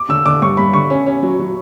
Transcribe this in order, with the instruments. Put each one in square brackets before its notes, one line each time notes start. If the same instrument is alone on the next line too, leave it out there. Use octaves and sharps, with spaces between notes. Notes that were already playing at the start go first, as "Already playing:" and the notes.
Already playing: [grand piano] D6
[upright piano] D3 [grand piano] E6
[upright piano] D3 [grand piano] D6
[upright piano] G2 [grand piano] C#6
[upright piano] G2 [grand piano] B5
[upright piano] D3 [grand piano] C#6
[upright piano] C#4
C#4
F#3
F#3